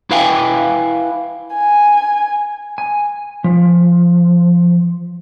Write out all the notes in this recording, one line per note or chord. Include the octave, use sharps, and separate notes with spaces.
E4 B4 F5 G5 G#5
G#5
G#5
F3